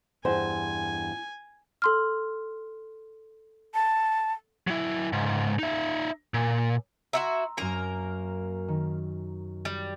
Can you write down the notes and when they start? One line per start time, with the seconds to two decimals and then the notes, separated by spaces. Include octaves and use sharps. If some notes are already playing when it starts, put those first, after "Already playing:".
0.25 E2 G2 C5 G#5
1.82 A4 C6 F6
3.74 A5
4.67 F#3 E4
5.13 C#2 G#2
5.59 D#4 E5
6.34 A#2
7.13 E4 F#4 E5 A#5 C6 E6
7.57 F#2 A#3 C#4 A#4 D#7
8.68 D#3
9.65 G3